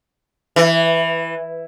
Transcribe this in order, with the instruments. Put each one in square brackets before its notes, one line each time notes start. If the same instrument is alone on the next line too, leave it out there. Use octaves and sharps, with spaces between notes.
[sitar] E3